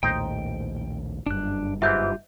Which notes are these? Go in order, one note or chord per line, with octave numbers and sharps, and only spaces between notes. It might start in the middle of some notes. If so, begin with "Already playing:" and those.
A#1 D#2 A2 D#4 C5 G5
F#1 G2 D4 F#6
G#2 E3 F4 G4 E5 G6